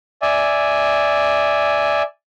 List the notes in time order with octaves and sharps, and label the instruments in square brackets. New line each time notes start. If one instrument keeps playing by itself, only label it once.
[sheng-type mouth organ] D5 E5 G#5